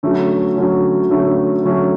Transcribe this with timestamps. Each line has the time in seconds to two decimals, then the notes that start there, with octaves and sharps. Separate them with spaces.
0.03 D3 F#3 A3 C#4
0.56 D3 F#3 A3 C#4
1.10 D3 F#3 A3 C#4
1.63 D3 F#3 A3 C#4